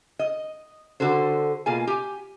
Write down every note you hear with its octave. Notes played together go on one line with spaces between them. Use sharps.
D#5
D3 F#4 A4 C5
B2 A#3 F4 G#4 G#5
G4 G#5